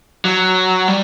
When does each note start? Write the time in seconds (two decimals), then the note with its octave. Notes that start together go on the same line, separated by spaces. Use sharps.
0.25 F#3
0.88 G3